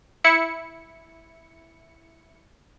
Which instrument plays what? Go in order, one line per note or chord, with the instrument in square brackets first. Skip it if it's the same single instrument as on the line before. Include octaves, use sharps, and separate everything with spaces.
[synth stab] E4 C#7